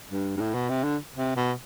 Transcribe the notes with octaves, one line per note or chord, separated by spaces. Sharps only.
G2
G2
A2
B2
C3
D3
C3
B2